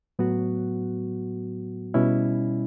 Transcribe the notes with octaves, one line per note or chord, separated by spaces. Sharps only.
A2 F#3 B3 F#4
B2 G3 C#4 E4